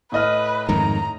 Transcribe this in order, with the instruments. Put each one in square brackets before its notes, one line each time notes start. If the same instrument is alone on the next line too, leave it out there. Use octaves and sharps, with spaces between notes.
[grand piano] A2 D#5 F6 [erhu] B4
[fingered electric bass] F2 G#2 D#3 [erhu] A#5